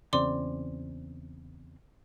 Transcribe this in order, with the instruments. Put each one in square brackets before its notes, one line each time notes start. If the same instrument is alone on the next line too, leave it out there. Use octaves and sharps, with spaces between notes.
[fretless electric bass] E2 C#3 C4 [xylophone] D5 C6 D6